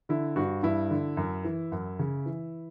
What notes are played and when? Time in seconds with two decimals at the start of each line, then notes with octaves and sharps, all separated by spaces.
0.09 D3 E4
0.36 G2 F#4
0.63 G2 E4
0.90 D3
1.17 F#2
1.44 E3
1.72 F#2
1.99 C#3
2.26 E3